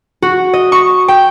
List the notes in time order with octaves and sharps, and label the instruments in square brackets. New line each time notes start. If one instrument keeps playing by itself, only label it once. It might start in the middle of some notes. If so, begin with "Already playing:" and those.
[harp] F#4
D#5
C#6
G5